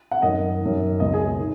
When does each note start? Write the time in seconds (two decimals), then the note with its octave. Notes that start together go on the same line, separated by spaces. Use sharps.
0.11 F#5
0.22 F#2 D#3 D#5
0.61 F#2 D#3
1.00 C#2 B2 D#5
1.13 G#4
1.38 D#3